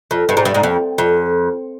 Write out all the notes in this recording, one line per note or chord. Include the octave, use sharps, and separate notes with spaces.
F2
G2
G#2
G2
G#2
F2
F2